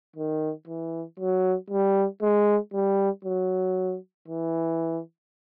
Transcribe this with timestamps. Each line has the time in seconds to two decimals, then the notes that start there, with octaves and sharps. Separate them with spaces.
0.16 D#3
0.68 E3
1.19 F#3
1.70 G3
2.22 G#3
2.73 G3
3.25 F#3
4.28 E3